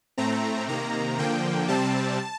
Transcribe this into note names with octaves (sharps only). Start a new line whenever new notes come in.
A2 A3 C4 A#5
C3 D#3 A#3 A#5
D3 F3 A#3 G5
C3 G3 C4 A5